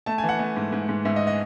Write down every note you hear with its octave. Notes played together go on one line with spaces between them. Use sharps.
A3 A5
G#5
E3
F#5
A3
G#2
G#2
G#2
G#2 E5
D#5
D#5